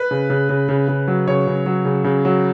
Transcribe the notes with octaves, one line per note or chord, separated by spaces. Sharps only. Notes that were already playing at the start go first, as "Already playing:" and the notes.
Already playing: B4
C#3
C#3
C#3
C#3
C#3
F#3
C#3 C#5
C#3
F#3
C#3
C#3
F#3